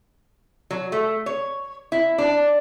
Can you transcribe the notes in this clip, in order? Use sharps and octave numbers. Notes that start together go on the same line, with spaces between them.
F#3
A3
C#5
E4
D4